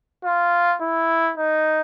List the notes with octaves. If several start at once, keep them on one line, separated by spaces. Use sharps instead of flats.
F4
E4
D#4